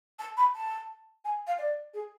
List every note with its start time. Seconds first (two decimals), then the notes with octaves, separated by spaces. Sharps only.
0.19 A5
0.37 B5
0.55 A5
1.24 G#5
1.47 F5
1.58 D5
1.94 G#4